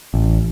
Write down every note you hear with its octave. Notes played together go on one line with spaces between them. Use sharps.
A1